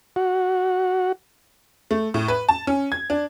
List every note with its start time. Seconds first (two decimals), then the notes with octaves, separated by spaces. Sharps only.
0.16 F#4
1.91 A3
2.14 A2
2.28 B4
2.49 A5
2.67 C#4
2.92 G#6
3.10 D4